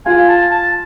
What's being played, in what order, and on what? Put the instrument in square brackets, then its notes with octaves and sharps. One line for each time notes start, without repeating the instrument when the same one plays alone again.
[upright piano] F4 [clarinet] G#5
[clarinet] A5
A5